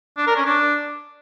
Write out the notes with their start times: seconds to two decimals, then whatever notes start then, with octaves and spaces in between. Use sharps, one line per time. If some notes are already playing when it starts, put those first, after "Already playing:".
0.18 D4
0.27 A#4
0.36 C#4
0.46 D4